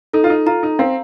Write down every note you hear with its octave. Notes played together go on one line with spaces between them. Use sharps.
D#4 A4
F4
D#4
F4 A#5
D#4
C4 F5